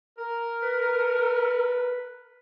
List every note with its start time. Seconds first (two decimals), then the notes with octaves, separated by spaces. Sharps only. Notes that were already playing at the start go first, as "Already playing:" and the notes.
0.18 A#4
0.63 B4